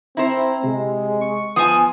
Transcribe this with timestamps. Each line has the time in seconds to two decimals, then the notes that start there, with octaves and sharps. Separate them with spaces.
0.17 C4 E4 C5 A#5
0.64 C3 G#3
1.21 C#6
1.56 F3 B3 G#5 D#6